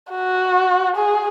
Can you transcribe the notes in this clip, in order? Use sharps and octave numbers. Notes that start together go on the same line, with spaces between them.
F#4
G#4